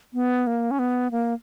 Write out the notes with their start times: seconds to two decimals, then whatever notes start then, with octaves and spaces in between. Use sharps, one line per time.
0.14 B3
0.47 A#3
0.71 C#4
0.79 B3
1.11 A#3